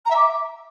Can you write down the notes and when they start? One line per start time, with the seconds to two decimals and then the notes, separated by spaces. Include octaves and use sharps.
0.05 A#5
0.10 E5
0.15 D6